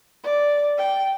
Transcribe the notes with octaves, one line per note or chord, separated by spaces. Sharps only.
D5
G5